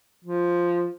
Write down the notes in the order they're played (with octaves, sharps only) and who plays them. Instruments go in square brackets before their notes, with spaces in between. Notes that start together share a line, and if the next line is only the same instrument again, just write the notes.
[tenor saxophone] F3